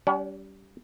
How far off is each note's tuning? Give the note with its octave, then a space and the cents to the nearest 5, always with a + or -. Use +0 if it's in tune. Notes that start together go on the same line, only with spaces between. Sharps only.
G3 -15 C#4 +40 F#5 +5